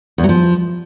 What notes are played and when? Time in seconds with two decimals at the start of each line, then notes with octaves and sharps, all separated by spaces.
0.18 E2
0.24 F#3
0.29 F3